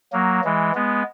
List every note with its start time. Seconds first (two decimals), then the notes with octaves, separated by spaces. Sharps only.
0.13 F#3 A#3
0.44 E3 G#3
0.75 G#3 B3